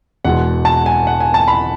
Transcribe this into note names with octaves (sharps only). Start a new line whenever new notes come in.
E1 E2 B2 G#3 F#5
A5
G#5
F#5
G#5
A5
B5